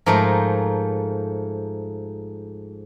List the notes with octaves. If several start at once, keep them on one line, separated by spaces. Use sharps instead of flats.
G#2 F3 A3 A#4 C5 A5